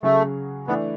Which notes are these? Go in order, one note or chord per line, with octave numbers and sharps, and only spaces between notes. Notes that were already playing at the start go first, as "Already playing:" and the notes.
C#3 F#3 A3 C#4 G#4
E3 A3 B3 D4